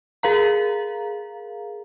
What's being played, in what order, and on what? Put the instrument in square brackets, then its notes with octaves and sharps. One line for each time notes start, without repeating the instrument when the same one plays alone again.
[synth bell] G#4 A#4 F5 A#5